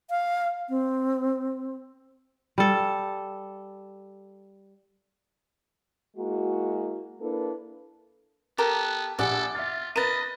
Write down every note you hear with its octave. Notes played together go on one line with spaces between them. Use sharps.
F5
C4
G3 A4
G#3 A#3 E4 F#4
A#3 D4 E4 A4 B4
B3 G4 A4 A#4
A#1 G4 A4 D5 F#5 G#5
F4 E5 A6
A#4 B4 D#5 A6 D#7